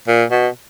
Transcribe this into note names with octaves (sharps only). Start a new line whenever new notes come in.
A#2
B2